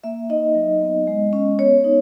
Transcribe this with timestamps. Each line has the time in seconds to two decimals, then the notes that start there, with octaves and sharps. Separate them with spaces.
0.04 A#3 E5
0.29 D#4 D#5
0.55 F#3
0.81 B3
1.07 G#3
1.33 C#4
1.59 B3 C#5
1.84 D#4